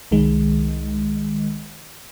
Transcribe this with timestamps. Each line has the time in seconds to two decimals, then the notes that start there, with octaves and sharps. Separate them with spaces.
0.11 C2 D#3 G#3